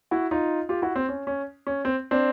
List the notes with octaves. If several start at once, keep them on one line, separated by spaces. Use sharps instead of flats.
E4 F#4
D#4 F4
F4 G4
E4 F#4
C4
C#4
C#4
C#4
C4
C4 D4